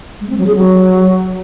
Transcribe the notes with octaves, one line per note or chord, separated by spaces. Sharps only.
G#3
C4
F#3
G#4
F#3